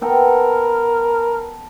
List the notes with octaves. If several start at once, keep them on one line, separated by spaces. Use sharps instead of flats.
B3 A4 A#4 G5